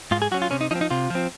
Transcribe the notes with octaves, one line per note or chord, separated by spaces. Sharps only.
G#2 F4
G#4
F#3 C#4 F#4
F4
C3 C#4
D#4
F3 C4 D#4
D#4
C3 F4
F3 C4